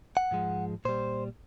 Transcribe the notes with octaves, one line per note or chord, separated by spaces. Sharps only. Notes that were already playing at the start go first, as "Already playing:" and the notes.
F#5
G#2 F3 G#3
A#2 G3 C5